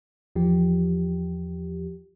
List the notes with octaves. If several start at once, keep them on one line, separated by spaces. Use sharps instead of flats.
E2 F3 G4